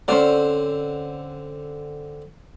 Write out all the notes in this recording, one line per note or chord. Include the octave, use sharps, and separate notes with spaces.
D3 C4 C#4 C5 D5